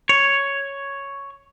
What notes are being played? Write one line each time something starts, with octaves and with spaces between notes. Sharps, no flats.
C#5